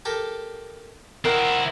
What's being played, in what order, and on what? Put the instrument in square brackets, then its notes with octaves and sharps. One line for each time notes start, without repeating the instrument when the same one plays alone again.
[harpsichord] G4 A4 A#4
[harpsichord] D#3 [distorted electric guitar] C4 E4 [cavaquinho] A#4 F#5